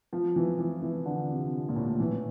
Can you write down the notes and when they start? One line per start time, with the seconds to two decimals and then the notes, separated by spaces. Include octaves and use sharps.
0.13 F3
0.36 E3
0.59 E3
0.82 E3
1.06 D3
1.30 C3
1.69 A#2
1.76 A2
2.00 E3